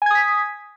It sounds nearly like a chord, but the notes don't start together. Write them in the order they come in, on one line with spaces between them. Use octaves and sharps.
G#5 G#6 D#6 B6